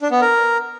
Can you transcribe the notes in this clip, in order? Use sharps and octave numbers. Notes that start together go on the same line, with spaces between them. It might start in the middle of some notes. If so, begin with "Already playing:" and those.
D4
B3
A#4